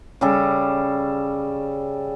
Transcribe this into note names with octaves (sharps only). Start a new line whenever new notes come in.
C#3 G3 A4